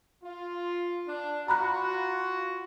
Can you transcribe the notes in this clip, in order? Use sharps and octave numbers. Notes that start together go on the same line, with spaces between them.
F4
D4
F4 F#4 A#5 B5 F#6